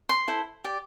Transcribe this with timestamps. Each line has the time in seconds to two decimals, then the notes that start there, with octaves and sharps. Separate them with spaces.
0.09 C6
0.28 E4 A4 C5
0.64 G4 D5